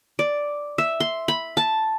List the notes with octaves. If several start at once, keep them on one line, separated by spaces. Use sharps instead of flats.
D5
E5
C6
B5
A5